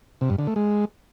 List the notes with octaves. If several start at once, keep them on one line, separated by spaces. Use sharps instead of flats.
C3
G2
D3
A3
G#3